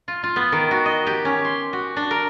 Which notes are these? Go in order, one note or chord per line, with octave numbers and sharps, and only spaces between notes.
F4
F4
B3
D#3
F#4
D#5
G4
C#4
C6
F#4
D4
A#4